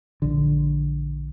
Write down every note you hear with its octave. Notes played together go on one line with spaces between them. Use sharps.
A#1 D3